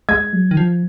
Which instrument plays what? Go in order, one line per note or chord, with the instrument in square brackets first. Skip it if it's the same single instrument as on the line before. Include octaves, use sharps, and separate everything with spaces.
[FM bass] G#3 [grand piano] G#6
[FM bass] F#3
D#3
F3